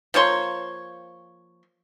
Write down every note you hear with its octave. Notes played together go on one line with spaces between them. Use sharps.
F3 A#3 C#5 C6